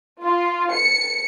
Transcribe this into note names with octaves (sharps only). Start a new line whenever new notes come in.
F4
C#7